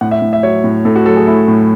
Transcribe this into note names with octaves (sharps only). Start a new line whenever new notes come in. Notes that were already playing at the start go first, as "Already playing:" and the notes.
A2 F#5
E5
A2
E5
F#3 C#5
A2
A2 A4
F#4
F#3 A4
G#4
A3 E4
A2